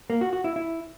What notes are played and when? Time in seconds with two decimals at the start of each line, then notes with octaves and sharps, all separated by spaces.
0.10 A#3
0.21 F#4
0.33 F#4
0.44 E4
0.56 E4